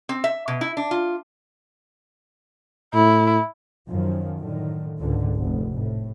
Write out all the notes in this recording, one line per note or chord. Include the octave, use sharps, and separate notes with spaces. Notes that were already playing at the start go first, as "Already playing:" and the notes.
C4
E5
B2
E4
D4
F4
A2 E4
F#2 D#3 F3
A2 D3 D#3
C#2 G#2 D3
F1 D2
A2